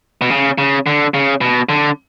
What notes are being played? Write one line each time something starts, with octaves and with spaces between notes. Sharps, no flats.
B2
C#3
C#3
D3
C#3
B2
D3